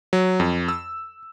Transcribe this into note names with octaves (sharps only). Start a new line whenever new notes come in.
F#3
F2
E6